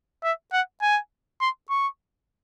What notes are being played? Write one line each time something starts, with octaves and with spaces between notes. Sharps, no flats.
E5
F#5
G#5
C6
C#6